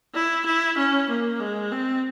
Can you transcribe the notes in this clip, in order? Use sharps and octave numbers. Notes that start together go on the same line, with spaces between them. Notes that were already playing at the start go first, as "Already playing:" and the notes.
E4
E4
C#4
A#3
G#3
C4